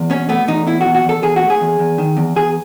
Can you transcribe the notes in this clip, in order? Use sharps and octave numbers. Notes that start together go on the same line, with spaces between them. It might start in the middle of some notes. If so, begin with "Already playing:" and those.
Already playing: E2
B2 C#4
A3 B3
E2 D#4
B2 E4
F#4
E2
F#4
E2 A4
E2 G#4
F#4
A3
G#4
E2
E2
D#3
E2
E2 G#4